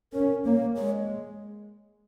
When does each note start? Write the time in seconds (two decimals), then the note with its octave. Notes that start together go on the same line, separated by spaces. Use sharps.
0.13 C#4 A#4
0.44 A#3 C#5
0.75 G#3 C#5